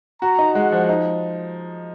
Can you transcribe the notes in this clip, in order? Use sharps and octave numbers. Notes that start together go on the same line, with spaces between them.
F#4 A#5
D#4
G#3 F#5
F3
D#4